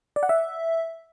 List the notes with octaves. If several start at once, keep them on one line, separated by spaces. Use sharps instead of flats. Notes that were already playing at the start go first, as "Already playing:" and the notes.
D5
F#5
E5